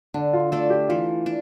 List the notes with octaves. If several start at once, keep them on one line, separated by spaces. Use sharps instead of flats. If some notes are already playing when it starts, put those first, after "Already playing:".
D3 D4
F4
A3 D4 F4 A4
G4
E3 F4
D4